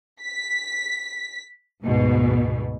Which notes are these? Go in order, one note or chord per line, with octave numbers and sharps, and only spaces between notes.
B6
D2 G#2 B2